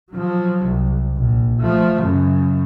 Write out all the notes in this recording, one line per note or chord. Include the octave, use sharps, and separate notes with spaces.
F3 F#3
C2
A#1
F3 A3
F#2 C#3